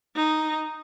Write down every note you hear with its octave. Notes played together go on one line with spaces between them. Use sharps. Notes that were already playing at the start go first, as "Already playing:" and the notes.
D#4